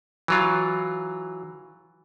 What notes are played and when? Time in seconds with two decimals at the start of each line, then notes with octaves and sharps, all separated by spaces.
0.28 E3 F#3 F4